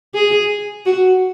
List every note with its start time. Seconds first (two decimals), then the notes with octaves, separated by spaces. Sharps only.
0.15 G#4
0.86 F#4